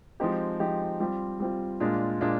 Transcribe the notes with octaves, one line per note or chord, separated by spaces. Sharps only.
F3 G#3 C4 D#4 G4
F3 G#3 C4 D#4 G4
G3 C4 F4
G3 C4 F4
A#2 G#3 D4 F4
A#2 G#3 D4 F4